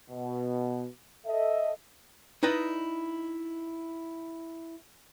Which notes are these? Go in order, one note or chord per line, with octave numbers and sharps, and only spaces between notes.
B2
A4 D#5 E5
D#4 E4 B4 D5 D#5